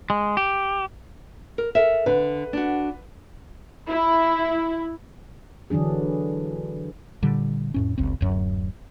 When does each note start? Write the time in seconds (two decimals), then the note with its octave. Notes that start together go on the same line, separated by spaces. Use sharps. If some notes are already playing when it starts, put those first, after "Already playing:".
0.10 G#3
0.37 G4
1.58 A#4
1.75 A4 A#4 E5
2.06 D3 B4
2.53 D4 F#4
3.89 E4
5.70 D3 E3 F#3 D4 G#4
7.23 A#2 D3 G3
7.74 F2 A2 C#4
7.98 F#1 C#2 C4
8.21 D1 F#2 F#3